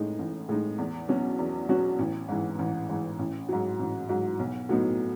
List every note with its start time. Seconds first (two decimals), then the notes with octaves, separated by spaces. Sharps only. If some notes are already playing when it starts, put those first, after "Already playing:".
Already playing: A1 A2 G#3 D#4
0.19 A1
0.49 A2 G#3 D#4
0.78 E2
1.09 B2 F#3 C#4 F#4
1.39 E2
1.69 B2 F#3 C#4 F#4
1.99 A1
2.28 G#2 E3
2.59 A1
2.89 G#2 E3
3.19 A1
3.49 G#2 F#3
3.79 A1
4.09 G#2 F#3
4.39 B1
4.69 A2 F#3 B3 D#4